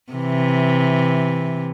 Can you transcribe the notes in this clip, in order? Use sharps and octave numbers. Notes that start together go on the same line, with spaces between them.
C3 E3